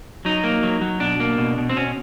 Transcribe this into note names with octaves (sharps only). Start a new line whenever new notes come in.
F#3 D#4
A#3
F#3
F#3
B2 D4
A#3
B2
B2
C4
B2 C#4